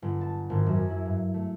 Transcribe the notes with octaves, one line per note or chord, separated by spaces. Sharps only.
G1
A5
G#1
F#2
E4
G2
A3